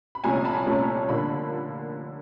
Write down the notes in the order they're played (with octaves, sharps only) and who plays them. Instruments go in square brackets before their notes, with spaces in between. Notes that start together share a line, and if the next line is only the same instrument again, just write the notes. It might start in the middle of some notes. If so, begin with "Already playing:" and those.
[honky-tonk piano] B5
C2 A#2 F3 A3 C#4 G#5 A#5
A5 B5
C2 A#2 F3 A3 C#4
D3 F3 A#3 D4 B5